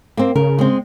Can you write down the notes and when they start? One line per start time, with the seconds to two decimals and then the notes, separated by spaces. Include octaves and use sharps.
0.17 A#3 C4
0.36 C#3 A#4
0.59 G#3 C4